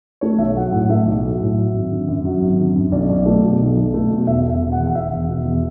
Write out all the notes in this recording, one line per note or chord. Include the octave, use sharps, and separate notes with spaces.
A3 C#5
B1 E5
F#3 F#5
A2 F#5
A3 E5
B1
F#3
A2
F#3
G#1
D3
F#2
F#3
G#1
D3
F#2
B1 D5
B1
A3
B2
B1
B1
A3
B2
E1 E5
E1
E5
B2
F#5
E2
F#5
E1 E5
E1
B2
E2